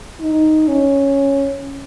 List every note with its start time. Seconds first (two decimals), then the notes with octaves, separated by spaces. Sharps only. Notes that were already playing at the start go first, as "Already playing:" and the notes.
0.20 D#4
0.68 C#4